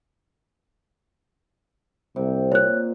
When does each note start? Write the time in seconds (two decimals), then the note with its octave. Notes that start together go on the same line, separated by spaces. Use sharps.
2.16 C2 C3
2.52 A#2 C#5 F#6